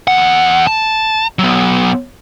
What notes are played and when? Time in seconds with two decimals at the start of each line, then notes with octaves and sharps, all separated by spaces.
0.08 E2 F#5
0.67 A5
1.39 F#3 B3